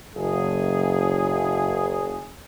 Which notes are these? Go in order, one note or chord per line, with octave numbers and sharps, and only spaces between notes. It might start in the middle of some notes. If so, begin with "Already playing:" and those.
F#1 G#4